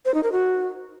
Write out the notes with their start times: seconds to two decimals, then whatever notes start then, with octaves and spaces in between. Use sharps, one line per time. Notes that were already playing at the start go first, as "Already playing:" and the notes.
0.05 C5
0.14 D#4
0.23 A#4
0.32 F#4